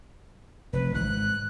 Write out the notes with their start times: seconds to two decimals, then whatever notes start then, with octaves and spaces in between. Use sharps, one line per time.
0.73 F1 B4
0.94 G#1 F#6